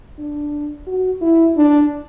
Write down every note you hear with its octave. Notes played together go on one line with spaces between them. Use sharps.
D4
F#4
E4
D4